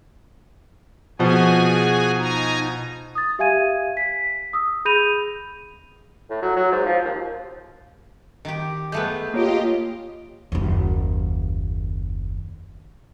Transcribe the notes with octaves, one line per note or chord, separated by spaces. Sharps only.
B2 F3 F#4 G#4 G#5
D#4 G#5 A#5
D#6 A6
G4 E5 F5 G#5 G#6 D#7
B6
D#6 E6
G#4 B5 G6 A#6 D#7 F7
A2
F#3
F#3
G#2
F3
D#2
D#3 G4
G#3 A3 B3 G6
A#3 F4 G4 C#5 D#5 D7
F#1 D#2